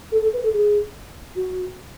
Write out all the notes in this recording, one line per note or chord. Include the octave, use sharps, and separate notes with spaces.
A4
A4
B4
A4
G#4
F#4